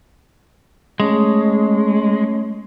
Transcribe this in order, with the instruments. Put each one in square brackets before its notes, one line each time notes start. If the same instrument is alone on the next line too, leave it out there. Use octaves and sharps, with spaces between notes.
[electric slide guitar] G#3 [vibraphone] A3 C#4 C#5